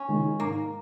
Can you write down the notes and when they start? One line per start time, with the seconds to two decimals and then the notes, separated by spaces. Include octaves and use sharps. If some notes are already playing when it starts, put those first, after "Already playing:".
Already playing: C#4
0.08 D#3 G#3
0.39 G#2 A#3